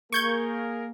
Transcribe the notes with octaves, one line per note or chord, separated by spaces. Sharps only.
A#3 G#4 A#4 C#6 G6 G#6